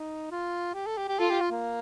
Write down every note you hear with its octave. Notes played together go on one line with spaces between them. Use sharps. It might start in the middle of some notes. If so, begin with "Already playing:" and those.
Already playing: D#4
F4
G4
A4
G4
G4
F4 A4
G4
F4
A#3